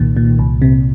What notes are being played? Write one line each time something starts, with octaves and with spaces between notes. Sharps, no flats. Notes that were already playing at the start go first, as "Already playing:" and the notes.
Already playing: C2 A#2 D#3
A#2
C2
C3